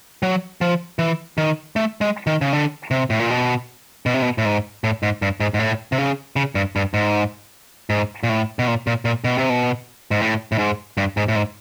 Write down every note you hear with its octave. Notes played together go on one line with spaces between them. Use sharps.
F#3
F3
E3
D#3
A3
G#3
D#3
C#3
D3
C3
A2
A#2
B2
B2
C3
B2
A2
G#2
A2
G#2
G2
G#2
G#2
A2
C3
C#3
C#3
G2
G2
G#2
G#2
A#2
A2
B2
A#2
A#2
A#2
B2
C3
B2
G#2
A2
A2
G#2
G2
G#2
A2
G#2